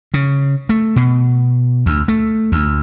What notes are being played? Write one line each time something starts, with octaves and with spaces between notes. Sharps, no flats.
C#3
A3
B2
D2
A3
D2